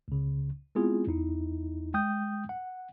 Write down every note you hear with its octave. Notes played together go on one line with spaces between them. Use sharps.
C#2 C#3
G#3 B3 C4 E4 F4 G#4
E2 D#4 E4
G#3 G5 D#6 G6
F#5